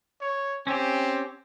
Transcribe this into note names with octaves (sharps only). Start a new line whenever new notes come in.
C#5
C4 C#4 G4